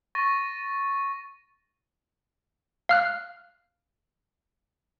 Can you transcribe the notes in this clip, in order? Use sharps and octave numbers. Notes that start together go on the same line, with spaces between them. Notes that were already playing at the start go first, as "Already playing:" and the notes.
C#6 A6 A#6 D#7
F5 F6 F#6